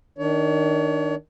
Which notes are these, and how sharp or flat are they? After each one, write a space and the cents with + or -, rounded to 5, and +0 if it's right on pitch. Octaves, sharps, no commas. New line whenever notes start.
D#3 +0 D4 +0 C#5 +35